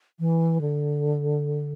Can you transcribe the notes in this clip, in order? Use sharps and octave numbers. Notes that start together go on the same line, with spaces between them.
E3
D3